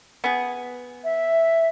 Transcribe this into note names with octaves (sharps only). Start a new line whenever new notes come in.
B3 G#4
E5